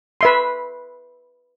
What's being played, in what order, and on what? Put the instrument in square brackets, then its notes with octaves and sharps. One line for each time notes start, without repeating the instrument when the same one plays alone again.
[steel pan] B4 E5 C6